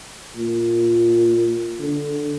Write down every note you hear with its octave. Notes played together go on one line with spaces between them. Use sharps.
A#2
D3